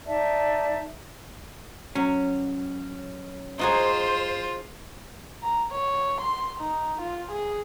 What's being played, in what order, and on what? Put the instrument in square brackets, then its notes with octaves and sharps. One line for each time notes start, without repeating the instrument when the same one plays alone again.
[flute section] D#4 D5 E5 A5
[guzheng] F#3 [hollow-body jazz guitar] C#4
[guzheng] D#4 F#4 G#4 [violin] F4 [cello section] C5
[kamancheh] A#5
C#5
C6
D#4
F4
G#4